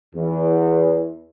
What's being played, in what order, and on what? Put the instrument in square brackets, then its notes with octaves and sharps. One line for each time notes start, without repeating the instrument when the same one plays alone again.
[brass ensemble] E2